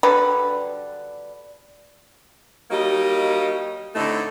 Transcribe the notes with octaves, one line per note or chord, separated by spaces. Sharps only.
D3 F#3 G3 B4
F#3 G3 A#3 D#4 G4 D#5
A2 D3 A3 C4 D#4